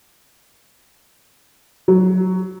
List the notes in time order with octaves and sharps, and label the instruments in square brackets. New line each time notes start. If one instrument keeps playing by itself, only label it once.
[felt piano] F#3